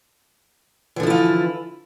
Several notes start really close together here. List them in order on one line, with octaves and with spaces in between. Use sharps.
E3 D3 F3 E4 F4